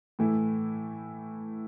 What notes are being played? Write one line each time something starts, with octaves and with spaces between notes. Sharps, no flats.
A2 E3 A3 E4